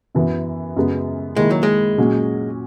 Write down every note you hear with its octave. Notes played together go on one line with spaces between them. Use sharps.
F#2 E3 B3
F#2 C#3 G#3 B3
D#3 G#3 A#3 E4
F#3
G#3
A#2 F#3 C#4 F#4